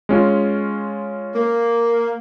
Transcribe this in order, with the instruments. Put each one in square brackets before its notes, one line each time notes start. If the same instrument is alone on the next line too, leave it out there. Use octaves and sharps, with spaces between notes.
[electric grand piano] G#3 C#4 F4
[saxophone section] A#3